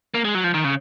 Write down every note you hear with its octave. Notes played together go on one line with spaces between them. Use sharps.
A#3
G#3
F#3
F3
D#3
C#3